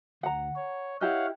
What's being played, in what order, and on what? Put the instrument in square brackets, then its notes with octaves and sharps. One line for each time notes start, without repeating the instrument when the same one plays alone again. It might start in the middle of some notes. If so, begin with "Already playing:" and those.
[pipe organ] D2 [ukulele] F#5 A#5
[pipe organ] C#5
[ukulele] E4 G4 D#5 [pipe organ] C#5 F5 F#5